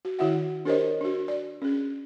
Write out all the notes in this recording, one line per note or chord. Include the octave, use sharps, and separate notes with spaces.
F#4
D#3 E4 F#4 E5 F#5
D4 G4 A#4 C5 C#5 D#5
D4 F#4
D5
C#4 G#4